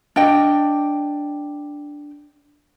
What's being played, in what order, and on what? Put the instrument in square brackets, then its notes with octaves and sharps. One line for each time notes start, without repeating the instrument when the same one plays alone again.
[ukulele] D4 D#5 G5